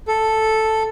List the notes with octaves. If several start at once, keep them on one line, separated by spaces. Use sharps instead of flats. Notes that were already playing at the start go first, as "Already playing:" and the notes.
A4